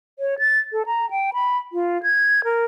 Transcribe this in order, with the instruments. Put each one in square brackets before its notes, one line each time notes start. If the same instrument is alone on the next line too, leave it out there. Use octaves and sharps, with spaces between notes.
[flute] C#5
A6
A4
A#5
G5
B5
F4
G#6
A#4